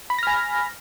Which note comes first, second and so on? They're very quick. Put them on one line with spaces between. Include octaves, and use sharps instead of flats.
B5 B6 A#6 F6 G#5